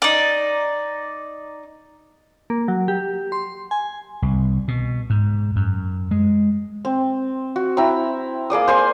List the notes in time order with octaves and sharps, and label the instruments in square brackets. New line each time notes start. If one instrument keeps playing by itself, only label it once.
[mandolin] D#4 D5
[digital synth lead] A#3
F#3
G4
C6
G#5
[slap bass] C2
B2
G#2
F#2
G#3
[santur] C4
F#4
E4 G5 A#5 E6
A#3 G#4 D5 D#6
C5 G#5 C6